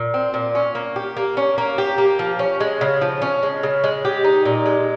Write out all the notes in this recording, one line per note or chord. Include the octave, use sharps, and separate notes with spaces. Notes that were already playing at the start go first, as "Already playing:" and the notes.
Already playing: A#2
C4
A#2
C#4
A#3
G4
A#3
C#4
A#3
G4
A#3
F3
C#4
G#3
C#3
F3
C#4
G#3
C#3
G#3
G4
D#4
A#2
G#3